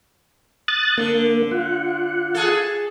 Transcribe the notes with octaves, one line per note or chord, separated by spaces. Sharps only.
D#6 F#6 A6
D3 A#3
F4 F#5
G#4 A4